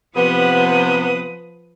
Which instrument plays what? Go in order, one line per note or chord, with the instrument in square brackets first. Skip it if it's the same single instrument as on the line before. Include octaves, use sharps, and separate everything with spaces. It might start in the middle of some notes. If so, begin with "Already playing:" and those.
[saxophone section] C3 B3 [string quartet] F3 B4 D#6